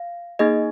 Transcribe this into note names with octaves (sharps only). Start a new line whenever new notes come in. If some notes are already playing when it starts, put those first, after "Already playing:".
Already playing: F5
A#3 D#4 G#4 D#5